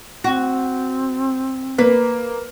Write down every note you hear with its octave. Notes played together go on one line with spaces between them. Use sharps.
C4 F#4
A#3 B4